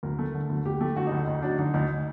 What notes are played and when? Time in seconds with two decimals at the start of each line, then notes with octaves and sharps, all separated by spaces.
0.03 D2 A#4
0.19 A3
0.34 D3
0.50 D2
0.65 D2 G4
0.81 A3 G4
0.96 D3 F#4
1.07 D#4
1.12 D2
1.27 D2 D#4
1.42 F#3 D4
1.58 D3 D#4
1.74 D2 D#4